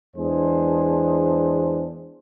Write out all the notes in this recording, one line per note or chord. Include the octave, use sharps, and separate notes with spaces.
E2 G#3 D4 G#4 C5